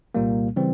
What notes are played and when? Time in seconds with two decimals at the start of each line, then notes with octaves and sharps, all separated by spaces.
0.15 C2 A#2 G3 A#3
0.56 C#3 E3 G3 C4